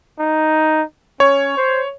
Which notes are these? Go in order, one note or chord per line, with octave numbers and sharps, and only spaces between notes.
D#4
C#4 C#5
C5